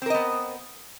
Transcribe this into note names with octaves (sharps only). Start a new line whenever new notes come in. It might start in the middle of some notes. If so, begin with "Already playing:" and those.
B3 C4 A#4 D#5